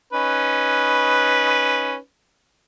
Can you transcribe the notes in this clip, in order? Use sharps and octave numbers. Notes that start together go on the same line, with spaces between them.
C#4 D#4 B4